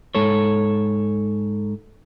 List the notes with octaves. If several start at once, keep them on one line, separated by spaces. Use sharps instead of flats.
G#2 A4 C#5